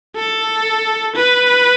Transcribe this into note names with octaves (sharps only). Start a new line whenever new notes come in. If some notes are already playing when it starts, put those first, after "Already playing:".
A4
B4